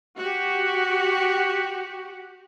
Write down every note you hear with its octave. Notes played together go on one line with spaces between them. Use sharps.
F#4 G4